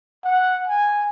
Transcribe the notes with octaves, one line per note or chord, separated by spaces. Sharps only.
F#5
G#5